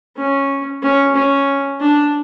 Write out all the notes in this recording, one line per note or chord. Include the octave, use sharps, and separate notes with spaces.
C#4
C#4
C#4
D4